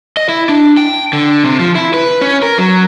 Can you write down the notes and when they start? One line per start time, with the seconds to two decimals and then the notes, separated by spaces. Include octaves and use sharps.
0.17 D#5
0.29 E4
0.49 D4
0.77 G5
1.13 D3
1.45 C3
1.60 F3
1.75 E4
1.94 B4
2.21 C#4
2.43 A#4
2.58 F#3